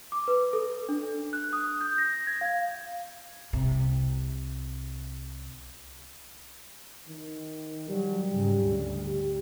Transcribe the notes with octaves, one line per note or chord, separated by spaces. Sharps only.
D6
B4
A4
D4
F#6
D#6
G6
A#6
G#6
F5
C2 C3
D#3
F#3 G3
G#2 C#3
D2
G4